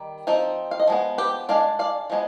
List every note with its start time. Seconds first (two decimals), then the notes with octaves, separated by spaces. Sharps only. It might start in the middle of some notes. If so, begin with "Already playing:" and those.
Already playing: D#3 G3
0.27 F3 C4 D#4
0.71 F5
0.79 D#5
0.87 F3 G#3 B3
1.18 G4 B4
1.49 G#3 D4 D5 F5
1.79 D5 F5
2.10 F3 G#3 B3